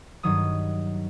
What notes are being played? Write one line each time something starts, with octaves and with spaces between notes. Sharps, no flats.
G2 D#3 F#3 D#6